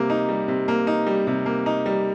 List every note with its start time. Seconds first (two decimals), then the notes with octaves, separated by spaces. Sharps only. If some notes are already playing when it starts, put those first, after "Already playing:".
Already playing: C3 G3 A#3
0.10 D#4
0.29 G3
0.48 C3
0.68 A#3
0.87 D#4
1.07 G3
1.27 C3
1.46 A#3
1.66 D#4
1.86 G3